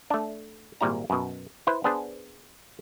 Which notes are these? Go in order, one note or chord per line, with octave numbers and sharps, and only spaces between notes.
A3 D4
G#1 A#2 G3 E4 A#5
F#2 B2
E4 B4 C5
B3 D4 G#4 C5